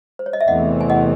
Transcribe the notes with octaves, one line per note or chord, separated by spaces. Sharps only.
C5
C#5
D#5
E5
E2 C3 E3 A3 C4 D#5 F#5
G#5
D#5 F#5